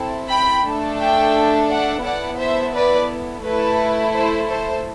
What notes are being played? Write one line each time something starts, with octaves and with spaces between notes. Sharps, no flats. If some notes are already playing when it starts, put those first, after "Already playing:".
Already playing: C4 E4 A4
G5 B5
A3 D4 A4
E5 G5
D5 F#5
B3 E4 A4 D5 F#5
C5 E5
B4 D5
A3 E4 A4 B4
A4 C5
A4 C5